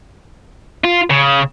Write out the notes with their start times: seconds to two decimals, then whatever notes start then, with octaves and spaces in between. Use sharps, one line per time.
0.84 F4
1.10 C#3